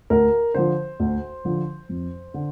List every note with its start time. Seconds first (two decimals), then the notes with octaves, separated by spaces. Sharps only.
0.10 D2 A#4
0.54 D3 F3 C5
1.00 D2
1.45 D3 F3
1.89 F2
2.34 D3